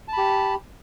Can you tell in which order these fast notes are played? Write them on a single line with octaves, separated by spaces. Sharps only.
A5 B5 G4